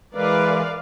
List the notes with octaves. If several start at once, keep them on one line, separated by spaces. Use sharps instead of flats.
E3 G#3 A#4 B4 D5 F5